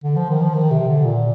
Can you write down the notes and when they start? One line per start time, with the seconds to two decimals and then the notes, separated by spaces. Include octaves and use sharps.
0.04 D3
0.16 F3
0.29 D#3
0.41 F3
0.54 D#3
0.71 C3
0.88 D3
1.05 A#2